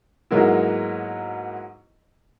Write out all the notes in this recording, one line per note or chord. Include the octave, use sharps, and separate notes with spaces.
G#2 F#3 G#3 A#3 B3 E4